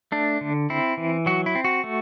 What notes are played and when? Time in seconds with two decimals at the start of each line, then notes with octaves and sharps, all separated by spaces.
0.12 A3 D4
0.41 D3
0.70 C4 E4
0.97 E3
1.26 F#3 F#4
1.46 E4
1.55 C4
1.65 F#4
1.84 A3